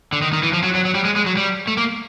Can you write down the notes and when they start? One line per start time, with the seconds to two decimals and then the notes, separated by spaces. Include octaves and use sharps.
0.12 D3
0.22 D#3
0.33 D#3
0.43 E3
0.53 F3
0.63 F#3
0.75 F#3
0.85 F#3
0.95 G3
1.05 G#3
1.16 G#3
1.26 F#3
1.37 G3
1.68 A3
1.77 A#3